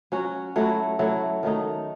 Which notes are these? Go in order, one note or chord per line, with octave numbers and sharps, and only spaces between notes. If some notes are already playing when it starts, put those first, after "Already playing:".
F#3 C#4 F#4
F#3 A3 E4
F#3 A3 E4
D#3 F#3 A3 D#4